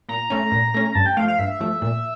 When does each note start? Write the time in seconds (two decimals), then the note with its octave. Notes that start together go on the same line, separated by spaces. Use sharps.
0.09 A#2 A#5
0.30 A3 C#4
0.52 A#2
0.74 A3 C#4
0.95 G2 A5
1.06 G5
1.17 F3 A3 F5
1.28 F5
1.39 G2 E5
1.60 F3 A3
1.82 A#2